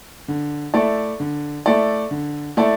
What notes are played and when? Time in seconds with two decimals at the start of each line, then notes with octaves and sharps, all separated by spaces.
0.28 D3
0.74 A3 E4 A4 D5
1.20 D3
1.66 A3 E4 A4 D5
2.11 D3
2.57 A3 E4 A4 D5